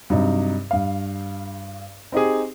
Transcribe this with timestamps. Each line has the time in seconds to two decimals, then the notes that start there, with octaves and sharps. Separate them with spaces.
0.10 G2 C3 F#3 D#4
0.71 G2 F5
2.12 C4 D#4 G4 G#4